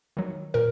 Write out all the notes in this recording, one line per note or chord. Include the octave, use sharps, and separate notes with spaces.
D#3 F#3
A#2 A#4